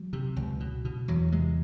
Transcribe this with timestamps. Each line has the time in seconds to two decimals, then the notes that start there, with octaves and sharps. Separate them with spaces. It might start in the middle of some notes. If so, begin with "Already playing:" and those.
Already playing: F#3
0.13 C3
0.36 C#2
0.60 B2
0.85 B2
1.08 E2 F#3
1.32 C3 G#3